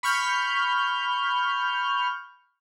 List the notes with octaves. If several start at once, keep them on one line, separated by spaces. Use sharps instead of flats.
B5 C#6 F6 G6